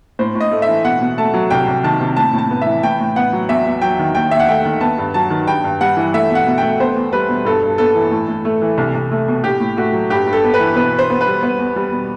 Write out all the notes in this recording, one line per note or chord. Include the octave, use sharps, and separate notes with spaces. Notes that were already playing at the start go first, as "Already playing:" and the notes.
A2 C5
A2
D#5
A3
E5
E3
B2 F#5
B2
A3 A5
F#3
C2 G5
C2
D#3 A5
C3
A2 A5
A2 A5
B3
E3 E5
A2 G5
A2
B3 F#5
F#3
E2 E5
E2
F#3 G5
D#3
D#2 G5
D#2 E5
F#5
A3 G5
D#3
B3 A5
G2
F#3 A5
D#3
G2 G5
G2
G3 F#5
E3
A3 E5
B2
F#5
B2
A3 G5
B3 C5
E2
G3 B4
B2
G2 A4
G2
B3 A4
E3
A2
A2
A3
E3
C2
C2
A3
B2
A2 G4
A2
A3 F#4
F#3
G2 G4
G2
A4
B3
B4
E3
B2 B4
B2
C5
B3
B4
G3
B3
E2
G3
B2